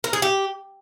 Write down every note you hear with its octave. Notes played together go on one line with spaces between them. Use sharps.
A#4
G#4
G4